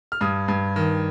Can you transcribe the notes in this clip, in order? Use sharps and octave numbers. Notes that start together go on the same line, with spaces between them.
F6
G2 D#6
G2
D#3